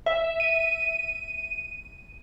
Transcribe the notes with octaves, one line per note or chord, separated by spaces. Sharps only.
E5
D#7